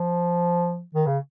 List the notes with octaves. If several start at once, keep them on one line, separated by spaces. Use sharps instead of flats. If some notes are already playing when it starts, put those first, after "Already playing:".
Already playing: F3
D#3
C#3